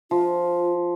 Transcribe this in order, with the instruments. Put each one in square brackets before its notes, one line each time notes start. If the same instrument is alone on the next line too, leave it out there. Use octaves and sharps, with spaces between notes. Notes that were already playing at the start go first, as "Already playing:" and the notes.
[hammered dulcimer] F3 [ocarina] F4